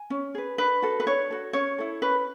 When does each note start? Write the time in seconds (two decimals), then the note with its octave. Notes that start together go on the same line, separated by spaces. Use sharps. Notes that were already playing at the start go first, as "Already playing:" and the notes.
Already playing: G#5
0.10 C#4
0.35 G#4 B4
0.58 D4 B4
0.82 F#4 A4
1.00 B4
1.06 D4 C#5
1.31 F#4 A4
1.53 C#4 C#5
1.78 E4 A4
2.02 C#4 B4